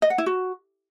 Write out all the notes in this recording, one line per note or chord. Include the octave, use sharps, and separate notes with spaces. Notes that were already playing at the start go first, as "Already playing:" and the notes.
D#5
F#5
E4
F#4